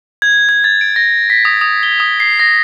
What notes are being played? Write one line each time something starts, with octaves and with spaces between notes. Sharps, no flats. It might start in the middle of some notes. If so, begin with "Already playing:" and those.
G#6
G#6
A6
D7
A#6
B6
D#6
D#6
G7
D#6
C7
A#6